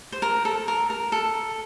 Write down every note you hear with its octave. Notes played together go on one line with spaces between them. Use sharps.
C5
A#4
A4
A#4
A#4
A4